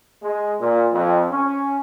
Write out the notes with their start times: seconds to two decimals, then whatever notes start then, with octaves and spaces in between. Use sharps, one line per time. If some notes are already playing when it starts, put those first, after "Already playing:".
0.22 G#3
0.58 A#2
0.91 F2
1.29 C#4